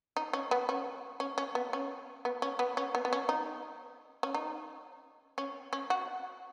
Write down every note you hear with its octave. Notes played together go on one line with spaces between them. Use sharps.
D#4
C#4
B3
C#4
C#4
C#4
B3
C#4
B3
C#4
B3
C#4
B3
B3
C#4
D#4
C#4
D#4
C#4
C#4
F#4